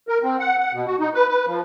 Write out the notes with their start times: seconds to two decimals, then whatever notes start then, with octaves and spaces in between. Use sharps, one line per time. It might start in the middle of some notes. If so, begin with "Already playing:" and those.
0.08 A#4
0.23 C4
0.39 F#5
0.59 F#5
0.73 B2
0.86 F#4
1.00 D#4
1.14 B4
1.28 B4
1.46 F3